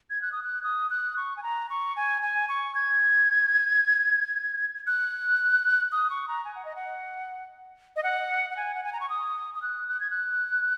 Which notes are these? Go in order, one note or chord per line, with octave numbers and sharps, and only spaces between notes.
G#6
F#6
D#6
F#6
D#6
F#6
C#6
G#5
A#5
C#6
G#5
G#5
C#6
G#6
F#6
D#6
C#6
A#5
G#5
F#5
D#5
F#5
D#5
F#5
F#5
G#5
F#5
G#5
A#5
C#6
D#6
D#6
F#6
F#6
G#6
F#6